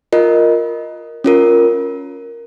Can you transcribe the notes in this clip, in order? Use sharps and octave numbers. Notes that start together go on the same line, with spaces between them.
F4 A#4 D#5
C#4 F4 A#4